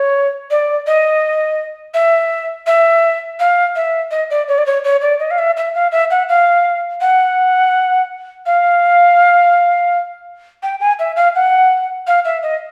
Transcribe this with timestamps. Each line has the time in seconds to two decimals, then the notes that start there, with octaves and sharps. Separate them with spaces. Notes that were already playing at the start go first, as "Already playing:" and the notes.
Already playing: C#5
0.51 D5
0.87 D#5
1.94 E5
2.67 E5
3.40 F5
3.76 E5
4.11 D#5
4.30 D5
4.48 C#5
4.58 D5
4.66 C#5
4.84 C#5
5.02 D5
5.20 D#5
5.31 F5
5.39 E5
5.57 E5
5.75 F5
5.92 E5
6.11 F#5
6.29 F5
7.01 F#5
8.46 F5
10.63 G5
10.81 G#5
10.99 E5
11.16 F5
11.35 F#5
12.07 F5
12.25 E5
12.43 D#5